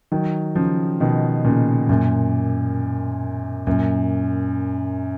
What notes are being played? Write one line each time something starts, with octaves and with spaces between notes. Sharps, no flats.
D#3 F#3
C#3 F3
B2 D#3
A#2 C#3
F#2 A#2
F#2 A#2